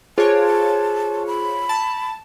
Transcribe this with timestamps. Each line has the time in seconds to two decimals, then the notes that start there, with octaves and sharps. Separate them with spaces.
0.18 F4 G#4 C5 C#5 A5
1.27 B5
1.69 A5